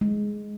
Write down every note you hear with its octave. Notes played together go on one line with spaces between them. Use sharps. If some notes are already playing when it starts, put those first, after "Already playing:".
G#3